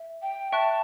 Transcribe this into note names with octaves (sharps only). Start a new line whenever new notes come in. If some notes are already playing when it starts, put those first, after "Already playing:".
Already playing: E5
G5
E5 G5 A5 C#6 F#6